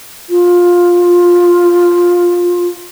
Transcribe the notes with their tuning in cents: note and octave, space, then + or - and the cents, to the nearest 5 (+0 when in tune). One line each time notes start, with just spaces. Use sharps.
F4 +10